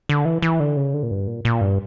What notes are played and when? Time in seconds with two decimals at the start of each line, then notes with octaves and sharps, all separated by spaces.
0.09 D3
0.25 E3
0.42 E3
0.60 D3
0.77 C#3
0.94 D3
1.03 A#2
1.11 G2
1.27 A#2
1.45 A#2
1.61 G2